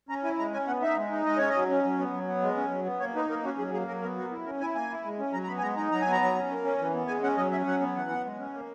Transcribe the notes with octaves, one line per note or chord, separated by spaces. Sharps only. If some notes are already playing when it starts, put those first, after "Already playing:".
C#4 A#5
E4 G#5
G#3 A#5
C#4 G#5
B3 F#5
D#4 E5
G#3
D#4
G#3 D#5
C#4 C#5
D#5
F#3
C#4
F#3
B3
F#3
B3
G#3
C#4
F#3
B3
A#3 C#5
D#4 B4
A#3 A#4
C#4 F#4
F#3 G#4
A#3 G#4
F#3 A#4
B3 A#4
A#3 F#4
E4
C#4 A#4
E4 G#5
A#3 G#5
E4
G#3
C#4
F#3 A#5
A#5
B3 B5
G#5
G#3 A#5
D#4 A#5
F#3 A#5
G#5
B3
A#5
F#3
C#4
A#3
C#4
E3
B3
G#3 G#5
C#4 F#5
F#3 D#5
C#4 E5
F#3 F#5
B3
E3 F#5
B3
G#3
C#4
A#3